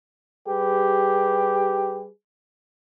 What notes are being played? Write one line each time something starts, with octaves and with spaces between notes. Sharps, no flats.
G3 G4 G#4 B4